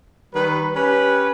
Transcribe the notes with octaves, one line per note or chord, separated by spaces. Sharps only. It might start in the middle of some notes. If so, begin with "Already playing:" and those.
D#3 G3 B4
C#4 G4 B4